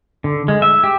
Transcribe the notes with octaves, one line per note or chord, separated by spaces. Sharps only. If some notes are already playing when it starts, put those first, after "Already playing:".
D3
G#3
E5
G4